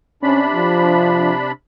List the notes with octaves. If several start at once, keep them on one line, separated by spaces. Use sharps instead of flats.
C3 C#4 D4 B5
F3